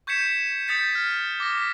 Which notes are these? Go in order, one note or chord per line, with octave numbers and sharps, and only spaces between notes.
C#6 G6 G#6 B6 C#7 E7
D#6 G6 A6 B6 C#7
F6
D6 A#6
B6